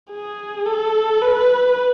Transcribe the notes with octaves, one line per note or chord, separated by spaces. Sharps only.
G#4
A4
B4